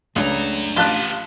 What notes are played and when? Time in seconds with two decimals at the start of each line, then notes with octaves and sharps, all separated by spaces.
0.16 C#2 F#2 A3 D4 B4 A#5
0.76 A1 B3 F4 G4 A5 F#6